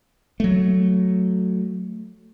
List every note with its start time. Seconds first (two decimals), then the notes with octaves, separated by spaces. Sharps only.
0.40 F#3 A3